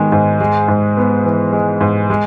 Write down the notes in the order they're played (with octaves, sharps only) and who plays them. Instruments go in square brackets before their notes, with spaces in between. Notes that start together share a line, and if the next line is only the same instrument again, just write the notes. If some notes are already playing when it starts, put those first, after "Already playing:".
Already playing: [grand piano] G#2 D#3 G#3 B3
G#2
G#3
G#2
B3
E3
G#3
G#2
G#3